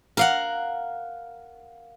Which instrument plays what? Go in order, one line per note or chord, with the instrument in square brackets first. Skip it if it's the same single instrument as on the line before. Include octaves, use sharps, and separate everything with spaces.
[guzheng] A#4 F5 F#5